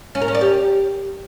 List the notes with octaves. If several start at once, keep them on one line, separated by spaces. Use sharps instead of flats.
C#4
A#4
C#4
D5
G4